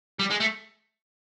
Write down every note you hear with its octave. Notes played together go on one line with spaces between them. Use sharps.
G3
G#3
A3